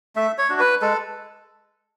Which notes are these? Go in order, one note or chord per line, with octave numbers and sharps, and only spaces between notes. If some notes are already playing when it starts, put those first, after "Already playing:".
A3 E5
C#5
D4 F#4
B4
G#3 A4